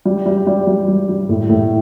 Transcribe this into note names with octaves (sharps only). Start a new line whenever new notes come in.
G3
G3
G3
G3
G3
G3
A2
A2